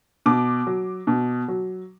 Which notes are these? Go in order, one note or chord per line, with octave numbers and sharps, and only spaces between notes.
B2 D6
F#3
B2
F#3